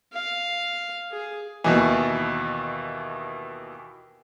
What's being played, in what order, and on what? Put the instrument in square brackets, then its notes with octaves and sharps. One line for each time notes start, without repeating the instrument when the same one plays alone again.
[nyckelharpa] F5
G#4
[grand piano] D#2 B2 E3